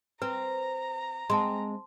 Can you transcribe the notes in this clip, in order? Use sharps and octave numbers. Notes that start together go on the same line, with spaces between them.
C4 B4 A#5
G#3 C4 A5 C6